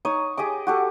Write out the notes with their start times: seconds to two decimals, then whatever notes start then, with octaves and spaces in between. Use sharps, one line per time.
0.05 D#4 C#5 D#6
0.37 G4 G#4 D#5 D6
0.67 F#4 G4 A4